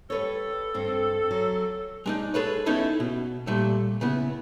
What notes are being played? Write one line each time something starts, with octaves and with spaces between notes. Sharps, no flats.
G3 A4 B4 C#5
G2 C4
F#3
G#3 D4 D#4
G#4 A4 B4 C#5
B3 C#4 D#4 E4 A4 C#5
B2
A#2 G3 A3 A4
C#3 B3 E4